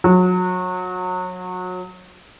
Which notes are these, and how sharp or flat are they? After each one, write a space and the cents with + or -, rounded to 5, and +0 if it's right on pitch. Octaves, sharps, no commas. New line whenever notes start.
F#3 -25